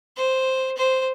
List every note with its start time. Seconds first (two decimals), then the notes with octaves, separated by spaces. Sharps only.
0.17 C5
0.77 C5